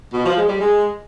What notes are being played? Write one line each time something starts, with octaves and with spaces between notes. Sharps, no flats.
B2
F3
G#3
G3
G#3